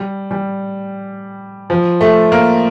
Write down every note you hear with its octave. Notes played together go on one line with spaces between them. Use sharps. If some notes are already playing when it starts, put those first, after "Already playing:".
Already playing: G3
G3
F3
A3
A#3